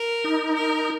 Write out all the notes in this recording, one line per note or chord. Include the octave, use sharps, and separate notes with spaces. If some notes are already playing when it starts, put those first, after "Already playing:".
Already playing: A#4
D#4
A#4